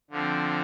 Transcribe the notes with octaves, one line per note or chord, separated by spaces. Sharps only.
D3 F3 C4